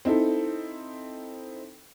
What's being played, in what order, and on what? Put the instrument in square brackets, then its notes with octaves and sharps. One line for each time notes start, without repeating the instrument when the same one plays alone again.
[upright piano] C4 D#4 E4 A4